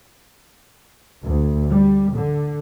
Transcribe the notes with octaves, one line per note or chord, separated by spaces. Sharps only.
D2
G3
D3